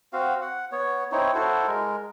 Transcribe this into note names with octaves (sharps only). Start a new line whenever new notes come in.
C4 F#4 F5
F#5
B3 C#5
C4 D#4 E4 C#5
E4 F#4 A4 C5
G#3 A#4